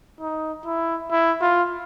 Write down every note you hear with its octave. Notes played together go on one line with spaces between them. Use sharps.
D#4
E4
E4
F4